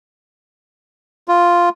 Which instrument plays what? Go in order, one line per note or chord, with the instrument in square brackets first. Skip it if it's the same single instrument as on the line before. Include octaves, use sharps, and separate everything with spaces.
[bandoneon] F4